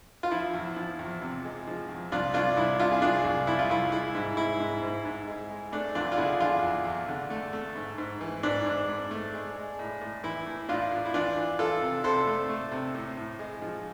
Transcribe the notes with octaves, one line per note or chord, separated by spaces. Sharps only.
F4
F3 E4
E2
F3
E2
C3
G#3
F3
E2
C2 D4 F4
C2 D4 F4
C2 E4
C3 D4 F4
G#4
C2 D4 F4
C2
C2 E4
F4
C2 E4
G#3 E4
G#2
G#3 E4
G#2
G#2
G#2
G#3
G#3
A3 D4
E2 D4 F4
F4
D3 E4 G#4
E2 D4 F4
E2
E2
D3
A3
A3
G#2
G#2
E3
G#2 D4
G#2
G#2
A3
G#3
G#3
A2
A2
E3 E4
A2
A2 D4 F4
A2
E4
E3 D4 F4
E3
E3 F4 A4
C3
C3 A4 C5
A3
A3
C3
A2
A2
G#3
F3